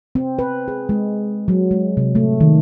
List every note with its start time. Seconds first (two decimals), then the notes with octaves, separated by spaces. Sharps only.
0.15 C4
0.39 B4
0.68 G#4
0.89 G#3
1.48 F#3
1.71 G#3
1.97 C3
2.15 A3
2.40 D#3